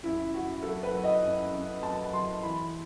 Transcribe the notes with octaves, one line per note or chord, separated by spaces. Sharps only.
F#2 E4
F#2 F#4
F#3 A4
B4
F#3
D#5
F#2
F#2
F#3 A5
F#3 C6
E3 B5